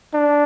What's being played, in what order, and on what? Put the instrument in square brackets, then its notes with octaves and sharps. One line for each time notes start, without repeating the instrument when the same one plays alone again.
[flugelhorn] D4